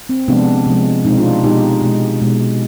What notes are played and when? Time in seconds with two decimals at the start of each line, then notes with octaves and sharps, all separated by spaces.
0.09 C4
0.28 C3 F3 G#3 B3 D4
0.66 C3 F3 G#3
1.05 B2 G#3 C4 D#4
1.18 D4 F4
1.44 B2 G#3 D#4 G4
1.82 B2 G#3
2.21 B2 G#3